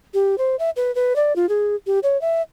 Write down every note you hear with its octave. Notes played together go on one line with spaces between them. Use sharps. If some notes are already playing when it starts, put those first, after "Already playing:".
G4
C5
E5
B4
B4
D5
F4
G#4
G4
C#5
E5